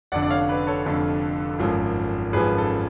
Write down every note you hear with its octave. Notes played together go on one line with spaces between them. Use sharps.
F1 F2 D3 D5 F#5
D5
C#5 F5
B4 D5
A4 C#5
F1 F2 D3
G#1 F#2 F3
G#1 F#2 F3 G#4 B4
A4